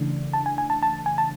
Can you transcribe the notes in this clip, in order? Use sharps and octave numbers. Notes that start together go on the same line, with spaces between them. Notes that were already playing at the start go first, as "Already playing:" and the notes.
Already playing: C#3 E3 A3 D4
A5
G#5
G#5
A5
A5
G#5
A5